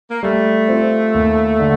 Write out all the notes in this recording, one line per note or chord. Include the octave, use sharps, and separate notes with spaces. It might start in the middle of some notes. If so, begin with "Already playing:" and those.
A#3
G3 A3
C4 F4
D#2
D3